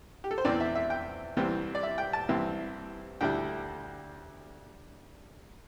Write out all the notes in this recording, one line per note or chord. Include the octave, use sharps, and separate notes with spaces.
G4
A4
C5
E2 E3 C4 D5
E5
E5
G5
C2 C3 E3 G3 C4
D5
E5
G5
A5
C2 C3 E3 C4 E4
D2 D3 G3 E4 G5